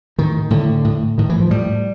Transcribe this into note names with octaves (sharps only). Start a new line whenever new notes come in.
A2 D#3
A2 D3
A2
A2 D#3
E3
F3
A2 G3